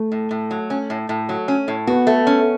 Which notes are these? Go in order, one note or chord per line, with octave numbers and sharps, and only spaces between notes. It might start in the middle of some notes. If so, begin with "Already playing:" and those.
Already playing: A3
A2
A2
F#3
C#4
A2
A2
F#3
C#4
A2
B3 F#4
A3
C#4